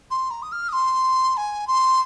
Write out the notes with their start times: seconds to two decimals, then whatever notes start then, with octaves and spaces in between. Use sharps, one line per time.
0.11 C6
0.31 A#5
0.42 D#6
0.52 F6
0.69 D#6
0.73 C6
1.37 G#5
1.67 C6